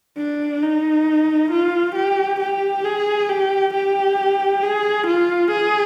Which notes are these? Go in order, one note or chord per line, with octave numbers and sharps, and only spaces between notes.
D4
D#4
F4
G4
G4
G#4
G4
G4
G#4
F4
G#4